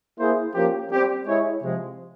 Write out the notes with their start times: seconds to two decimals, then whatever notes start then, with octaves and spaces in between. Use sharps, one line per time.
0.19 A#3 E4 G#4 C5
0.54 F3 A#3 C#4 G4
0.91 G3 C4 G4
1.26 G#3 E4 G#4 C#5
1.62 C3 F3 G#3